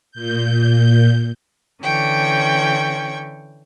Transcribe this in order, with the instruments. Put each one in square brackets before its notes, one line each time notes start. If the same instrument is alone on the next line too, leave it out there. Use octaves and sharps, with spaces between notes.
[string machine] A#2 G6
[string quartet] D3 E3 C#4 G5 C#6